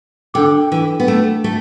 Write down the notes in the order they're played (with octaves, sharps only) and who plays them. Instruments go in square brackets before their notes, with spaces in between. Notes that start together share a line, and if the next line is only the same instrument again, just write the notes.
[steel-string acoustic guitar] D3 [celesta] D4 A4 G5 D6
[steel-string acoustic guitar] E3
B3
A3
A3